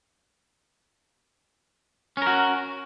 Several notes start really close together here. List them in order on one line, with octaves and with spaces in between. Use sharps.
C#4 A#4 F#4